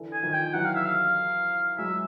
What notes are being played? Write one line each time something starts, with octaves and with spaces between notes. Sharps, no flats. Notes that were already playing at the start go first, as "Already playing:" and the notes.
Already playing: D3 E3
G#5
D#3 F3
G5
E3 F#3 F#5
F5
E5
F5
F#3 G#3 E5